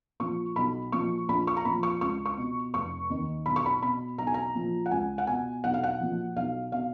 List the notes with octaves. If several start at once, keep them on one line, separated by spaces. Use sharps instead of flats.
A#2 F3 C#6
B1 B5
A#2 F3 C#6
A#1 B5
C#6
A#5
A#2 F3 B5
C#6
C#2 C#6
C#6
B2
F1 C#6
D#2 D#3
B1 B5
C#6
B5
B2 B5
B1 A#5
G#5
A#5
A#2 F3
F#5
C#2 G#5
F#5
B2 G#5
B1 F#5
F5
F#5
A#2 F3
B1 F5
B2 F5